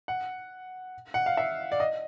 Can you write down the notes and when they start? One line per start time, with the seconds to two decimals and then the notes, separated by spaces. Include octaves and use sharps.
0.08 F#5
1.14 F#5
1.26 F5
1.37 E5
1.72 D5
1.80 D#5